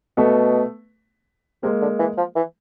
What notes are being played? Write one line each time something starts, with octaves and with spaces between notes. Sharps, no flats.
B2 A3 B3
C3 G#3 A#3
D3
E3
F3
E3